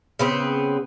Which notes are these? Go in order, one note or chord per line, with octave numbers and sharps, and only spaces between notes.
C#3 B3 C4